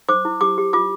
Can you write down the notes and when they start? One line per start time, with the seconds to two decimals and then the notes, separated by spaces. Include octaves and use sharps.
0.09 C5 D6
0.25 E4
0.41 G4 D6
0.58 G4
0.73 F4 D6